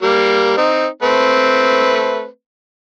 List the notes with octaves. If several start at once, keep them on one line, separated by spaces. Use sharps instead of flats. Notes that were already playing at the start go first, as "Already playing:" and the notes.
G3 A#3
C4 D#4
A3 C4 B4